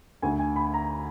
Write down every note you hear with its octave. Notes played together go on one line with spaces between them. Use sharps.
D2 D3 G#5
G#5
B5
A#5